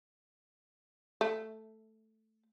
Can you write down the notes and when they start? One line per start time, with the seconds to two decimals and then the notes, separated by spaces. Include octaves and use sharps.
1.21 A3